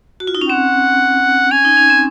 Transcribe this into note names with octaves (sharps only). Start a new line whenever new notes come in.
F#4
F4
D#4
C#4
C4 F#5
C#4 G#5
D#4
C#4
C4